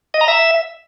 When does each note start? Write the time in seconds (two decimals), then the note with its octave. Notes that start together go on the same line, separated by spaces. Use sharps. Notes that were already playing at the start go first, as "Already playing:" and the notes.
0.14 D#5
0.21 A#5
0.28 E5